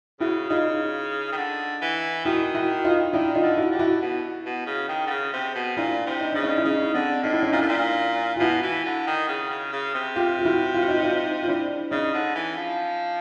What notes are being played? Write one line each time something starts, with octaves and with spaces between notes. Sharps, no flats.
C#3 E4 F#4
C#3 D#4 F4
D#3
D3
E3
D#3 E4 F#4
E4 F#4
D#4 F4
D#3 D4 E4
D#4 F4
D3
E4 F#4
D3 G4
E4 F#4
B2
B2
C#3
D#3
D3
C#3
C3
B2
A#2 D4 E4
C3
D#4
C#3 D4
C#4 D#4
E4
C#3 C#4 D#4
D3 C4 D4
A2 D#4
E4
C#4 D#4
A#2 D4 E4
A2
A#2
F4
B2 E4 F#4
E3
D3
D#3
C#3
C#3
C#3
C3
F4 G4
F4
E4 F#4
F4
F#4
D#4 F4
D#4 F4
F4
D4 E4
C#3 C#4 D#4
D3
E3
F3